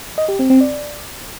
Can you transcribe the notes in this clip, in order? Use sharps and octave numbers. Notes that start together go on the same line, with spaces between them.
D#5
G4
C4
C4
D5